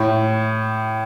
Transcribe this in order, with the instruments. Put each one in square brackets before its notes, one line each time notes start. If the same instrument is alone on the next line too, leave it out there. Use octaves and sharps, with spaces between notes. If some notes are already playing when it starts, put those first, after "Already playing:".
Already playing: [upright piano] A2